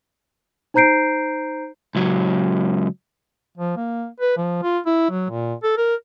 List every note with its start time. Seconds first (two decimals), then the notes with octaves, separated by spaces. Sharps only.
0.74 D#4 C5 A#5 G6 C7 D7
1.95 C#2 F#3
3.57 F3
3.77 A#3
4.20 B4
4.37 F3
4.63 F4
4.86 E4
5.10 F#3
5.30 A#2
5.63 A4
5.77 A#4